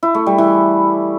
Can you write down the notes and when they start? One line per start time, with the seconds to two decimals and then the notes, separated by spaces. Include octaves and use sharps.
0.03 E4
0.15 A3
0.26 G3
0.38 E3